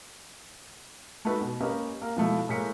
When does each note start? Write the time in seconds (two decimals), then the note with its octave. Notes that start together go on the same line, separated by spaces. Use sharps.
1.25 A3 D#4 F#4 B4
1.41 B2
1.61 A#3 C#4 G4 B4 D#5
2.02 A#3
2.16 B2 F3 A3 E4
2.49 A2 G#3 A#3 B6 C#7